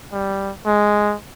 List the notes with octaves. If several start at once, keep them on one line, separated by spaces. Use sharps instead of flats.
G3
G#3